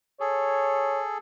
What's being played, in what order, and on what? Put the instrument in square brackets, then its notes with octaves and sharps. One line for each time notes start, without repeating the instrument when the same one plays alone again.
[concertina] G#4 A4 [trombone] C#5